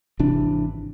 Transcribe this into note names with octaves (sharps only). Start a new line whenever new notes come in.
G#1 C3 E3 D4